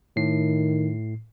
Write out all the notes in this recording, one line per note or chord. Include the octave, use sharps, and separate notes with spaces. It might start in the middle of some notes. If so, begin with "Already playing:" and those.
A2 D#3 C7